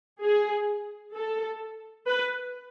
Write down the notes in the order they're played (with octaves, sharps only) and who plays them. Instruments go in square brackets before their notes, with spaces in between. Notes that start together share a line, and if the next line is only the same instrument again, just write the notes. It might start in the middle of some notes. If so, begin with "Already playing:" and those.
[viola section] G#4
A4
B4